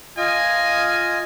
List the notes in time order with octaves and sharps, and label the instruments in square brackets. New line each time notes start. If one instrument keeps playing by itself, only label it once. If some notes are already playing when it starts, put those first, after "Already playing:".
[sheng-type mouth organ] F4 D#5 [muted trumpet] G#5